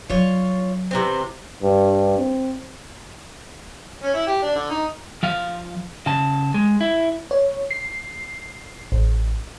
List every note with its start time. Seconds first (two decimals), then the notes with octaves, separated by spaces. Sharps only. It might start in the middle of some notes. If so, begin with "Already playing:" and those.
0.10 F3 F#3 F4 C#5
0.91 C3 E3 C4
1.62 G2
2.18 C4
4.03 C#4
4.14 E4
4.27 G4
4.43 D4
4.56 D3
4.71 D#4
5.23 F3 F5
6.06 C#3 A5
6.54 G#3
6.81 E4
7.31 C#5
7.71 C7
8.92 A1